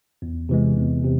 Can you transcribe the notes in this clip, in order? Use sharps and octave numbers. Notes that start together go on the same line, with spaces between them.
E2
C3 E3 G#3
E2
C3